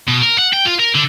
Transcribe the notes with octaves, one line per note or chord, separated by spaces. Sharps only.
B2
A#4
F#5
G5
F4
A#4
D3